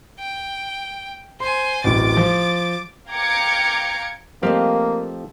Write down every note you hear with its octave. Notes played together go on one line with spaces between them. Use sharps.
G5
C5 G#5 C6
D1 A1 D6 A6
F3
F5 G5 A#5 D6 G#6 C#7
F3 A3 A#3 C4 G4 D#5 F5